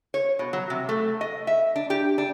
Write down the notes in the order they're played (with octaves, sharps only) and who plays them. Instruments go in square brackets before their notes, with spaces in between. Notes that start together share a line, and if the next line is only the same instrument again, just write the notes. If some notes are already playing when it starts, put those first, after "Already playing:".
[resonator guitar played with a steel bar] C#5
B2
F#3
C3
A3
D#5
E5
D4
G4
D4